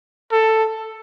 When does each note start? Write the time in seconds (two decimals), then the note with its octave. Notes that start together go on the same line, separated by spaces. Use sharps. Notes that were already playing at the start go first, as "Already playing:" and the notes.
0.32 A4